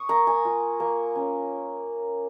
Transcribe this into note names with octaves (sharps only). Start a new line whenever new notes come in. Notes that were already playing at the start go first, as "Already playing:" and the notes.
Already playing: C#6 D#6
A#3 A#5
G#5
F4
A#3
C#4